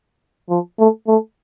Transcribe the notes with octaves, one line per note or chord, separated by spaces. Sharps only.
F3
A3
A3